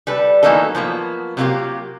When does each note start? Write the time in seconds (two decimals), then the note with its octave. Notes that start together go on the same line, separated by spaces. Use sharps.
0.07 G3 A4 B4
0.43 E3 F#3 A#3 B3 D#4 A4
0.75 F3 F#3 A#3 B3
1.37 C3 F#3 A#3 E4 F4 G4